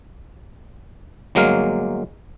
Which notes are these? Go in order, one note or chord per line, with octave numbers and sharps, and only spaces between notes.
G1 F#3 G#3 A#3 F5